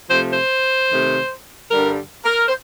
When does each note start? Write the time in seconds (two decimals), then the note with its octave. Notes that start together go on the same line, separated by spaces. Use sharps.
0.08 C3 F3 A3 C5
0.32 C5
0.89 C3 D#3 A3
1.70 G2 D3 G3 A#4
2.24 A#4
2.47 C5